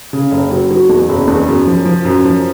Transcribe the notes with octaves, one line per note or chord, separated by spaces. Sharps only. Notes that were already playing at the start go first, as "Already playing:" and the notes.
C#3
F#1
F#3
F#3
E2
F#1
E2
F#2
F3
F3
F#2
F3